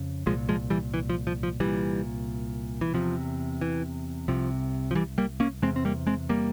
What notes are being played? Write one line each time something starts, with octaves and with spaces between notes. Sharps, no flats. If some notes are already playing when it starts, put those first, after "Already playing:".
Already playing: F2 C#3
C2 A#2 F3 G#3
F3 G#3
E3 G3
E3
F3
F3
F3
C2 A#2 E3 G3
E3
E2 C3 F3
E3
C2 C3 F3
F3
E3 G3
G3 A#3
A#3 C#4
E2 C3 G#3 C4
C4
G3 A#3
G#3 C4
G3 A#3